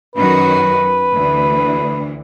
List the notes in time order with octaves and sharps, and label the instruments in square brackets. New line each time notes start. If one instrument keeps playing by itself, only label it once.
[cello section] F#2 D#3 F#4 [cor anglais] B4
[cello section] D2 E3